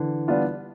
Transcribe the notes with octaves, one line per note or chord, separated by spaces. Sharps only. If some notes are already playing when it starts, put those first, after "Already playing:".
Already playing: D3 E3
G3 B3 D4 F4